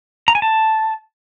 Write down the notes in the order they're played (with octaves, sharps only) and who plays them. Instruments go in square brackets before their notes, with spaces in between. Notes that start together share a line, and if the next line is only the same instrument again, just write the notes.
[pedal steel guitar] A#5
G#5
A5